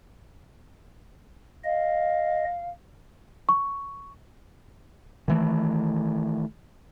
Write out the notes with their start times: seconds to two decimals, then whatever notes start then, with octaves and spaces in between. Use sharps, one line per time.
1.64 D#5 F5
3.49 C#6
5.28 D#3 E3 A3